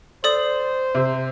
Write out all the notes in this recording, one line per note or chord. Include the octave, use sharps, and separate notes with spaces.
A4 C5 D5 D#6
C3